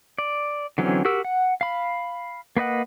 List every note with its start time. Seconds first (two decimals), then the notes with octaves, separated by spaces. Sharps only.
0.18 D5
0.78 D3 E3 F#3 C4 C#4
1.05 F#4 G4 A#4 E6
1.24 F#5
1.61 F5 B5
2.57 A#3 B4 D#5 F#5